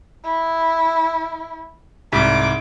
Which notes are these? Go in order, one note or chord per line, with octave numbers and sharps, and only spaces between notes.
E4
C2 G#2 D6 B6